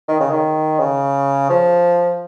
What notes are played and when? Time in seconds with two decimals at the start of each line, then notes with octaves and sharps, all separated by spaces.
0.08 D#3
0.20 C#3
0.31 D#3
0.79 C#3
1.50 F3